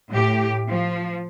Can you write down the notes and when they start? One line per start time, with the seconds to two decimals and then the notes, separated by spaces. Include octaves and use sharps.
0.10 A2 G4
0.70 F3